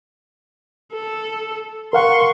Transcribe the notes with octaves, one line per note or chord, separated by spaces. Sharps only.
A4
A#4 F5 F#5 C6 C#6